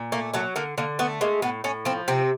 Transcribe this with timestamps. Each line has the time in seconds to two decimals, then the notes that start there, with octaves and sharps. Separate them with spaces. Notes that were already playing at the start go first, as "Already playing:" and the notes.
Already playing: A#2
0.12 A3 A#3
0.34 F#3 A3
0.56 D3 A#3
0.78 D3 A#3
0.99 A3 B3
1.21 G#3 A#3
1.42 A2 B3
1.64 A2 C#4
1.85 F3 C4
2.08 C3 C4